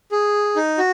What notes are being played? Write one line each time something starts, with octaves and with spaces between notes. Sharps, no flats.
G#4
D#4
F#4